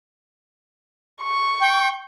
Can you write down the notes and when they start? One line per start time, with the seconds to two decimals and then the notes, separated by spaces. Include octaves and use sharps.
1.22 C#6
1.61 G5